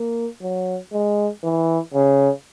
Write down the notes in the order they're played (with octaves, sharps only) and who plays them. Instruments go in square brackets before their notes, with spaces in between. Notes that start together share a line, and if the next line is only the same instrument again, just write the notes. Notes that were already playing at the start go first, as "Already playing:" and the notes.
Already playing: [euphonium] A#3
F#3
G#3
E3
C#3